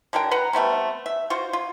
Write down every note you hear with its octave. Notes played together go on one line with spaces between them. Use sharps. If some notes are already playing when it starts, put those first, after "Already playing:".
D3 F#3 A#4 G5
B4 F#5 A#5
G3 A3 B3 C4
E5
F4 F#4 C5
F4